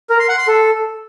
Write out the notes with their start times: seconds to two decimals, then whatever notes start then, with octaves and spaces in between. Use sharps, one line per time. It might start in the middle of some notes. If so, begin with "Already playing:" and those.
0.10 A#4
0.19 C6
0.29 F#5
0.38 C6
0.47 A4